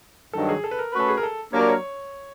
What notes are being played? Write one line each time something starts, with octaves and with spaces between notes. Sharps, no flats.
G2 D#3 F#3 A4
G#4
A4
B4
A#4
A3 C#4 F#4 B4
A4
G#4
A#4
A4
F#3 A#3 D4 G4 A#4 C#5
D5
C#5